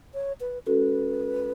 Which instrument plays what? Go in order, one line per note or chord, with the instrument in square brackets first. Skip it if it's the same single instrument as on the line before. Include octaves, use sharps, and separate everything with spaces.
[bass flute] C#5
B4
[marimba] G#3 C#4 F#4 A4 [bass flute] B4